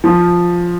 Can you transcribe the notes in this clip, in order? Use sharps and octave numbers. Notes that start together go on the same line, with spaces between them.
F3